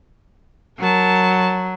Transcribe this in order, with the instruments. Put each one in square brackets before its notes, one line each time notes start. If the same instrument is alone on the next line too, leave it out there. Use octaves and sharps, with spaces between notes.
[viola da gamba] F#3 [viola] A#4 A5